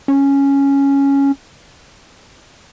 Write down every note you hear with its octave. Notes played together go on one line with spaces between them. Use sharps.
C#4